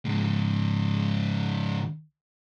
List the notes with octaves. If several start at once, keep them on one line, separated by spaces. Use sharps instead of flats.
C#2 G#2